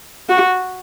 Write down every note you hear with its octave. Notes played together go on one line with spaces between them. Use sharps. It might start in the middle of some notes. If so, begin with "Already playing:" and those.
F#4